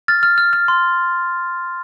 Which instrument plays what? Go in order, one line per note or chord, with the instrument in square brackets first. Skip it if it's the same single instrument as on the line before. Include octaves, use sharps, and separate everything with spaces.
[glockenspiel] F6 A6
F6
F6
F6
C6